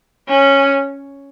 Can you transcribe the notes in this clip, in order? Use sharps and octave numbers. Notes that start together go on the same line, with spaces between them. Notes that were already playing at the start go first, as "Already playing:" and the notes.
C#4